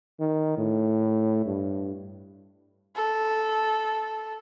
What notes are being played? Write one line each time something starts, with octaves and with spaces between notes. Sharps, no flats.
D#3
A2
G2
A4